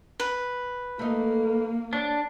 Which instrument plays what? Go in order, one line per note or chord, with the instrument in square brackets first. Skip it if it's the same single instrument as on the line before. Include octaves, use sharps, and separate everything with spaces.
[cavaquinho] B4
[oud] A3 D#4 [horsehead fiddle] A#3
[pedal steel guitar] D4 [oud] C#5